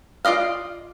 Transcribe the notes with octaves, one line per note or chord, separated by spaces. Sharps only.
F4 D5 D#5 F5